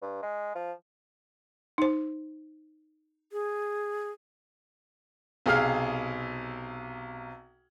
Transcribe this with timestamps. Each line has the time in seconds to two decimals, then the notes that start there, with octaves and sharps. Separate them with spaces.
0.02 G2
0.22 G#3
0.55 F3
1.78 D#4 C5
3.32 G#4
5.46 B1 C3 G#4 F5 F6